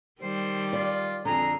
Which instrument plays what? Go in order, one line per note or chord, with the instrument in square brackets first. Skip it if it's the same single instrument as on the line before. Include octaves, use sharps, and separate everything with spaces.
[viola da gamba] D#3 G3 [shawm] C5
[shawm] F4 [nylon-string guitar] D5
[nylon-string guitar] F2 D3 [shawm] G#4 [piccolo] A#5